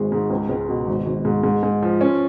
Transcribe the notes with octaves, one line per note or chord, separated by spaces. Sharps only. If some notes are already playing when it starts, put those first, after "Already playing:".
Already playing: G#1 G#3
G#2
C#2
C#2
B2
G#1
G#1
G#2
G#2
G#2
F3
C#4